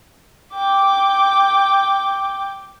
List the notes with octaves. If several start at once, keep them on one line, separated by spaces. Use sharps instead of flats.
G5 D6